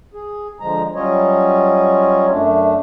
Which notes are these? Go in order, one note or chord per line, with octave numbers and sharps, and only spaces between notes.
G#4
D3 F3 G#3 A#5
F#3 G3 C#4 F4 C#5 D#5
F#2 A3 D4